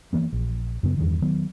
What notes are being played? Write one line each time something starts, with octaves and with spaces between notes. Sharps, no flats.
E3 A#3 B3
A#1
F#2 C#3 B3
E2 G2 D#3
D#3 F#3 B3